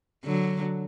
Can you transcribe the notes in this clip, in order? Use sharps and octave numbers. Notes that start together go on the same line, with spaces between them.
D3 F#3